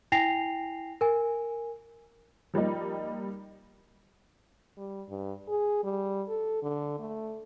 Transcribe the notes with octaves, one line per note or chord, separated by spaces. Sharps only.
E4 G5 G#5 A#6 C7 F7
A#4 G#5
F3 G3 A#3 D#4
G3
G2
G#4
G3
A4
D3
A3